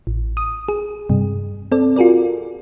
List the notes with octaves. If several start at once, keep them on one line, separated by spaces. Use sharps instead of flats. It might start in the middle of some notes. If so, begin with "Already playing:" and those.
A1
D#6
G#4
G2 C3
C4 A4 D5
F4 F#4 G#4 A#4 D5